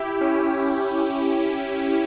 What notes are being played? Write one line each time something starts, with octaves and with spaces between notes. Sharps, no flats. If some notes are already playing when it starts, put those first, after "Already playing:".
Already playing: E4 G4
C#4 E4